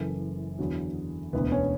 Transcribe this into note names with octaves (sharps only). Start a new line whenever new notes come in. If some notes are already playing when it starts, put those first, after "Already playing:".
Already playing: F#1 F#2 C#3 E3 A4
E2 D3 F#3
E1 D2 D3 B3
C#4